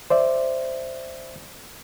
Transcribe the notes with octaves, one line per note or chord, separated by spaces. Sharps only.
C5 D5 E5